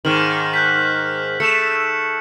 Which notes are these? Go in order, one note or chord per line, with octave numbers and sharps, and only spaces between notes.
G#2 D#3 F6 F#7
F#6 G6 B6
A3 C#7 E7